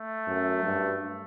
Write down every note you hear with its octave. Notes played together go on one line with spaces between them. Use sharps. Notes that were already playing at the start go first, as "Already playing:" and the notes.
Already playing: A3
F#2
G2